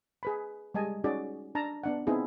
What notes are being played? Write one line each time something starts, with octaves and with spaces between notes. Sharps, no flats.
G#4 B4 B5
G3 G#3 D#5 G#5 A5
C#4 D#4 F#4 G#4 D5
D4 A5 A#5
B3 D4 F#5
B3 C4 D#4 E4 G#4